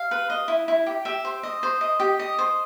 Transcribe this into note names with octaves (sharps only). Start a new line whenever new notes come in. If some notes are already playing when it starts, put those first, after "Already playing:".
Already playing: F5
B4
D#5
E4
E4
G4
G4 E5
C5
D#5
C5
D#5
G4
D#5
C5